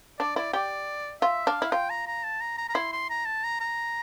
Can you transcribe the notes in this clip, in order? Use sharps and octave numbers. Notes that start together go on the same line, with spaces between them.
D4 D5
E4 D5
G4 D5
F4 E5
D4 F5
E4
F4 G5
A#5
A#5
A5
A#5
A#5
A#5
E4 C6
C6
A#5
A5
A#5
A#5